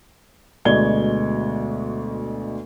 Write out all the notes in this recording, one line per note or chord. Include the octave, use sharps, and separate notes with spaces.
D2 B2 G#3 D5 G#6 G7